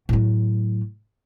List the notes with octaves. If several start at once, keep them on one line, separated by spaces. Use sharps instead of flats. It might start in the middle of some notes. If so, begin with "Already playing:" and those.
A2 F#3